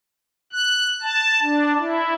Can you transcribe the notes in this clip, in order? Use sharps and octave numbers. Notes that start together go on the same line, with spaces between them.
F#6
A5
D4
E4